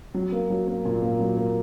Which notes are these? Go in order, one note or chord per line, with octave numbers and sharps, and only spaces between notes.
F#3
A#3
F#3
A#3
A#2
A#3
F#3
A#3